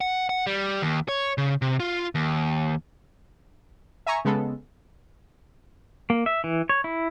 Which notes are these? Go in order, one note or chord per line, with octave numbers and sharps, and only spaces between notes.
F#5
F#5
G3
D#2
C#5
C#3
C3
F4
D#2
E5 G#5 A#5 C#6
C#3 G#3 B3 A4
A#3
E5
E3
C#5
E4